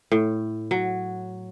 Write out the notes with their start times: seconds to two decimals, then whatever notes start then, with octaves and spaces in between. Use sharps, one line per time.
0.12 A2
0.71 F#3